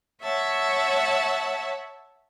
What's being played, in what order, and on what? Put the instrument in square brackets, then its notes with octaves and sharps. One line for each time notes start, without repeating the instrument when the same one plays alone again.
[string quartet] C#5 E5 F#5 A5